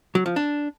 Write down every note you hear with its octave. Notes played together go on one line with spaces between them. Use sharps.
F#3
F3
D4